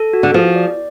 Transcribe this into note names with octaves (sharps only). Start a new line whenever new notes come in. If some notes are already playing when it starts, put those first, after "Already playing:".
Already playing: A4
F#4
D3
F3 G#4
D5